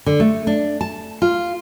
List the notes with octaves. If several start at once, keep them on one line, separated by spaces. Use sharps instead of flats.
D3
A3
D4
A5
F4